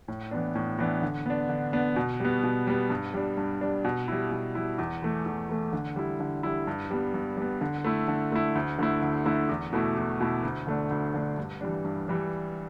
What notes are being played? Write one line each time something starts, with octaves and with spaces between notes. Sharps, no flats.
A2
E3 B3 D4
A2
E3 B3 D4
D3
B3 D4
D3
B3 D4
B2
G3 B3
B2
G3 B3
G2
G3 D4
G2
G3 D4
B2
G3 E4
B2
G3 E4
E2
E3 A3
E2
E3 A3
D3
G3 E4
D3
G3 E4
G2
G3 B3
G2
G3 B3
D3
A3 E4
D3
A3 E4
D2
D3 A3 E4
D2
D3 A3 E4
E2
B2 A3 E4
E2
B2 A3 E4
D2
D3 A3 D4
D2
D3 A3 D4
G2
E3 G3 D4
G2
E3 G3 D4